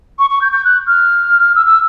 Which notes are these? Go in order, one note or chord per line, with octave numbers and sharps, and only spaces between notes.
C#6
C#6
G6
G6
F#6
F6
E6
E6